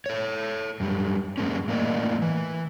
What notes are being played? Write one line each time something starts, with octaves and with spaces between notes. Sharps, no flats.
A4 C#5
F#2 G3
F#2 G#3 A#3 C#4
A2 A#3 A#4 D5 D#5
E3